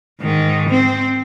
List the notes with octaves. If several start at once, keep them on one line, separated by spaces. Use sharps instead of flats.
G#2 D#3
C4